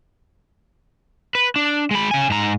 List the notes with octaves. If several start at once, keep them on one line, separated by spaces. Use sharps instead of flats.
B4
D4
G#3 B5
C#3 G#5
G#2 A#5